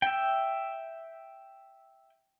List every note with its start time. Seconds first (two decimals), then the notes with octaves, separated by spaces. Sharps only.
0.02 E5 G5